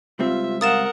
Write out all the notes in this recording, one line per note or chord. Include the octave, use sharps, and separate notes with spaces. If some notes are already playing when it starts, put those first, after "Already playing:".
C#2 G3 C4 F4 E5
A#4 F5 F#5 D#6 A6 E7